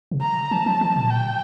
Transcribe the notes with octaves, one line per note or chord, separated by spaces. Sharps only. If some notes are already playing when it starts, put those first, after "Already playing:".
C3
A#5
E3 A5
F3
E3
A#2
G5